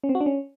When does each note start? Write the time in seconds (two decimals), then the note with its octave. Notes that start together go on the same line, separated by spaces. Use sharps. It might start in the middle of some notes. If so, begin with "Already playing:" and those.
0.04 C#4
0.09 C4
0.15 F#4
0.21 D4
0.26 C#4